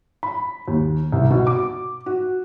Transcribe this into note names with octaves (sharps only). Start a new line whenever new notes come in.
B5
D#2
C2
B2
D6
F#4